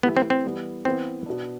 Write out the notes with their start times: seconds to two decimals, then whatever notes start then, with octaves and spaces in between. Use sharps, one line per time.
0.03 E3 A3 B3 E4 G4
0.17 C4
0.30 C4
0.44 E3 G3 B3
0.85 E3 B3 C4 E4 B4
1.26 B2 B3 D4